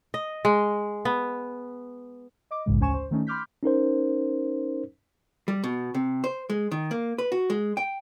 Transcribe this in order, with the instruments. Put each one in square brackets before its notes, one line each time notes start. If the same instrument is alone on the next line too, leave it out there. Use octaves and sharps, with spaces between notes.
[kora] D#5
G#3
B3
[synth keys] D#5 D6
A#1 E2 G#2 C#3 G#3
D2 C#4 C5 G#5 C#6 E7
C5
D#3 A3 C#4 D#4
B5 C6 D6 F6 G6 B6
[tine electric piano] C#4 D#4 A#4 C5
[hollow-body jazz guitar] G3
B2
C3
C5
G#3
D#3
A#3
B4
F#4
G#3
G5